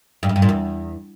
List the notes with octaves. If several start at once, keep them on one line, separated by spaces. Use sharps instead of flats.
G2
F#2
G2
A#2
E2